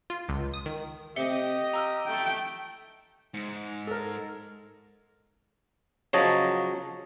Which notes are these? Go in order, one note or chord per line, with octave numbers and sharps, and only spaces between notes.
F4
C#2
D#6
D#3
C3 A3 C4 G4 D#5 E5 C#7 G7
F4 A#5 E6 F6
A3 G5
G#2
A4 A#4
C#3 F3 F#3 C#5 D#5 A5